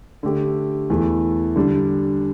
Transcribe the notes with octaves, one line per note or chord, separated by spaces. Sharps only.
D3 A3 G4
E2 E3 A3
D3 G3 D4